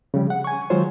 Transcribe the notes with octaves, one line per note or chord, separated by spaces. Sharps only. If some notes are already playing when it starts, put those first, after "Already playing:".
C#3 F3 G3
F#5
G#5 C#6
D#3 F#3 G#3 F4 C5 C#5